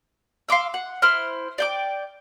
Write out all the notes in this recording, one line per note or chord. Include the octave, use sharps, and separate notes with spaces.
F5 C6 D6 E6
F#5
E4 C5 F6
D5 G5 D6